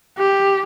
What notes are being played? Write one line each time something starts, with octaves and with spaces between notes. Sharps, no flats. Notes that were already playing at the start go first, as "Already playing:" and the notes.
G4